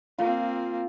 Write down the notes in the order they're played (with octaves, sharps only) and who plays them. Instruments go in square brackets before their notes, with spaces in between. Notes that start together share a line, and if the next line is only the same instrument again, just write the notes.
[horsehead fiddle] A#3 C4 [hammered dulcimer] F4